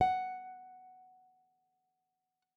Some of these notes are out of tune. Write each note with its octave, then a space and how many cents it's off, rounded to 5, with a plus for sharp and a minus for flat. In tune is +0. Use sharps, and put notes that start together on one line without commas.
F#5 +5